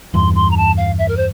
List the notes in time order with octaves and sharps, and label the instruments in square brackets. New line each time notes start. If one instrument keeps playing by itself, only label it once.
[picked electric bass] E2 G2 [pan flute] C6
[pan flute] C6
A#5
A5
F5
E5
A#4
C5